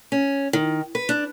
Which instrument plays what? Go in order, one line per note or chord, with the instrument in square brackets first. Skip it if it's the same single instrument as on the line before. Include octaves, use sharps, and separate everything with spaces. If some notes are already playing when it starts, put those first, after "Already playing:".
[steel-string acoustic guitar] C#4
D#3
B4
D4